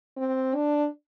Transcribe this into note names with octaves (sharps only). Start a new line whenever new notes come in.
C4
D4